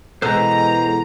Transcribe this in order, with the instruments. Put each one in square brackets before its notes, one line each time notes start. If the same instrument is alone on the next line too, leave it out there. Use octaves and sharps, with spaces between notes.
[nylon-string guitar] B2 E3 [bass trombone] G#3 [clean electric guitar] A4 B4 C5 [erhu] A#5